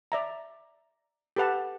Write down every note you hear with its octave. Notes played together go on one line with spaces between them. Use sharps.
D5 E5 A#5
G4 A4 B4 F#5 A5